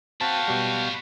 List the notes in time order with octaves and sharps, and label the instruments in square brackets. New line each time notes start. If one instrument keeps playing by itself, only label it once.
[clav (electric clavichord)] C4 [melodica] F#4 F5 G5 [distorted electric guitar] B4 C#5 [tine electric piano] A5
[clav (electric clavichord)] B2 G3